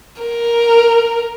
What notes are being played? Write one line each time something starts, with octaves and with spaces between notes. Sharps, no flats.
A#4